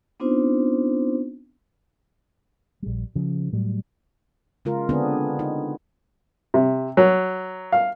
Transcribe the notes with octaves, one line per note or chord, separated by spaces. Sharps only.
B3 C4 D4 D#4 F4 C5
A#1 G3
C#3 F3
A2 F#3 G3
C#3 G#3 F4 A#4
D3 B3 C4 D4 G#4
D#4
C3
F#3
F5